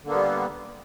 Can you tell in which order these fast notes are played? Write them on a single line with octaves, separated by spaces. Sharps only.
D3 A#3 B3 G3